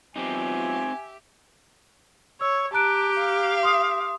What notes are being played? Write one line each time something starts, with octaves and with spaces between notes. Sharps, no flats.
F#3 B3 C4 D#4 F4 G4 E5 G#5
C#5 E6
G4 A5 A#5 F#6 D7
F5
C6 D#6